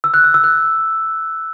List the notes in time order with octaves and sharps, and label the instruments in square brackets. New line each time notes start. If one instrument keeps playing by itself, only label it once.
[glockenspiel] E6
F#6
E6
E6
F#6